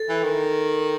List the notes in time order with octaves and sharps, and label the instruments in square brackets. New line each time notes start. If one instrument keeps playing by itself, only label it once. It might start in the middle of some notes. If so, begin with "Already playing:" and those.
Already playing: [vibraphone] A4
[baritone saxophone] E3
D#3